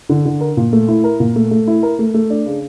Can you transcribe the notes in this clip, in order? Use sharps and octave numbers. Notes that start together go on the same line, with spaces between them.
D3
D3
A#4
A#2
A3
E4
A#4
A#2
A3
A3
E4
A#4
A3
A3
D4
C#3